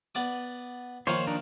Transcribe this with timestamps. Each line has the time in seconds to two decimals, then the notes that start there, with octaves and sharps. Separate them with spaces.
0.15 B3 D5 D6
1.07 D#3 F3 A#3 C5 C#5
1.27 D4 D#4 A#4